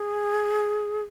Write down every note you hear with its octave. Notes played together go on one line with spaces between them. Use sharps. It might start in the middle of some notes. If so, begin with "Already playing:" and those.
Already playing: G#4